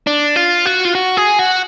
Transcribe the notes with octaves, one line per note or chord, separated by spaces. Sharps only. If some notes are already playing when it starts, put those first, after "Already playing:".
D4
F4
F#4
F4
F#4
G#4
F#4